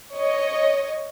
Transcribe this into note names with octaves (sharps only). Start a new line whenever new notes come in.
C#5 D#5